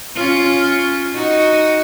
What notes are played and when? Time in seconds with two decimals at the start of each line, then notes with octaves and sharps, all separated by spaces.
0.15 C#4 F4
1.14 D#4 F#4